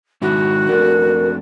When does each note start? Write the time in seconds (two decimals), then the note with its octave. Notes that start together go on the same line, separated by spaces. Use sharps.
0.22 G#2 D#3 E4 F#4
0.69 F2 A3 D4 A#4